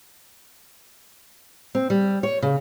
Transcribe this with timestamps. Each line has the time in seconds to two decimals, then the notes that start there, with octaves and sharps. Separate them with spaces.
1.75 C4
1.90 G3
2.23 C#5
2.42 C#3